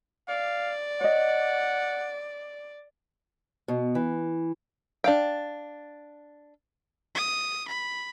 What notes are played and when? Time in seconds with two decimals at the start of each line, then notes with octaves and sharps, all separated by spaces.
0.28 D5 F5
1.01 C#5 D#5 F#5
3.68 B2
3.95 E3
5.04 D4 F5 G5
7.15 D#6
7.68 B5